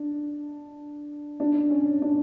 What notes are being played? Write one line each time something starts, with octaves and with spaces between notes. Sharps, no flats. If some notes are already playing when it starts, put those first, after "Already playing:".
Already playing: D4
D4
C#4
D4